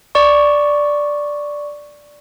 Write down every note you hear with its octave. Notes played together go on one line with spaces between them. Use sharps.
D5 C#6